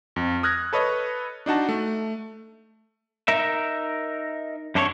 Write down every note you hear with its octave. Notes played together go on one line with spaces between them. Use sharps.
F2
D#6 F6 F#6 G#6 A#6
A4 B4 C#5 D#5
D4 D#4 F#4 A5
A3
D#4 A#4 E5
F#2 D4 A4 A#4 C#5